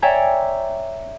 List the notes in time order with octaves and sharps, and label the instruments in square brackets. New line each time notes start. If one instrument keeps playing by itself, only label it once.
[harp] C#5 D5 E5 G5 G#5 A#5